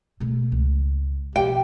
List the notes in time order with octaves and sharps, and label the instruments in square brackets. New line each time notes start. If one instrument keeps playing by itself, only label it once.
[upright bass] B2 A3
C#2
[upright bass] B2 F3 [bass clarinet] G4 [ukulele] G5